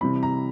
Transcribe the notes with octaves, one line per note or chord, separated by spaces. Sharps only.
C3 E3 G3 C4 B5
A#5